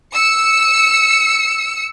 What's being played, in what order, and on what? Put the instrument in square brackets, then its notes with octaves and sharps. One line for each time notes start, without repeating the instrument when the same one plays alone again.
[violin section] E6 C#7